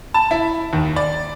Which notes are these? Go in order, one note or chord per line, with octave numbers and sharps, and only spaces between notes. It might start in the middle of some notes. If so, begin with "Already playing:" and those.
A5
E4
D#2
D5